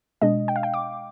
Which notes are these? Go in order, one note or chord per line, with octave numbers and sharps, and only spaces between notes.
B2 G#3 D4 D#5
G5
F5
G5
D6